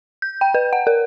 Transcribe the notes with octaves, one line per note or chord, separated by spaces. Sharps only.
G6
G5
B4
F#5
A#4